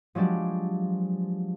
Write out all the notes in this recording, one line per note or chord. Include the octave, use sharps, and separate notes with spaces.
F3 F#3 G#3 D4 G4